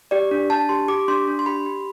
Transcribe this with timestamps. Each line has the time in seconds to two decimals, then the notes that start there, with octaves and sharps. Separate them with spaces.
0.11 G4 D5
0.31 D4
0.50 D4 A5
0.69 G4 C6
0.88 G4 D6
1.08 D4 C6
1.28 D4
1.39 C6
1.46 G4 B5
1.66 G4